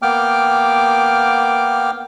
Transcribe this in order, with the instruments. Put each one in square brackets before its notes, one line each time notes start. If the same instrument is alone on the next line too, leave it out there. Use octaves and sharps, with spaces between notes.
[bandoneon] A#3 B3 G5 D6 F6